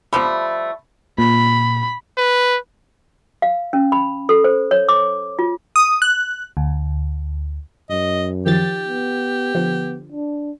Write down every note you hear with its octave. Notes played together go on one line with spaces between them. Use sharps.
F3 G3 A3 B5
A#2 B5
B4
F5
C#4
B5
A4
C5
C#5
D6
F4
D#6
F#6
D2
F#2 D#5
D#3 F3 G4 A6
B3
D3 F3 B3
D4